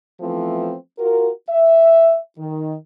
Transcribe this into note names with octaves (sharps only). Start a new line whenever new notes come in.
E3 F3 A3 B3 C4
F4 F#4 A#4
E5
D#3